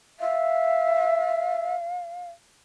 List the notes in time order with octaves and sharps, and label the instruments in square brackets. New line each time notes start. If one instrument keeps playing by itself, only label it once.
[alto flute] E5 [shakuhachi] F5